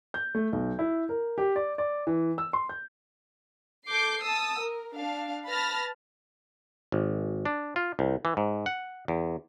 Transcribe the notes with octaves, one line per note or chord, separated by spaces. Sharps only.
G6
A3
B1
E4
A#4
G4
D5
D5
E3
E6
C6
G6
A4 D6 G6 C7
A5 D#6 E6
A#4
D4 F5
B4 A5 B5 F6 A6 A#6
G#1
D4
F4
C2
E3
G#2
F#5
E2